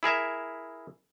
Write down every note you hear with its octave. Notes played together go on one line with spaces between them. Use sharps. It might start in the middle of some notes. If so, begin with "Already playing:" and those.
E4 G#4 A#4 E5